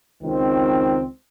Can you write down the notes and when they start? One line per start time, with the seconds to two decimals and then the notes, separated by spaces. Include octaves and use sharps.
0.23 C#2 D#3 C4